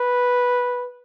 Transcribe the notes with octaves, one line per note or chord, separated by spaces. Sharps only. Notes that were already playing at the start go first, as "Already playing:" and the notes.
Already playing: B4